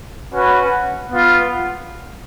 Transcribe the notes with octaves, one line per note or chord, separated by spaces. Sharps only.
C#4 F#4 B4
B3 F4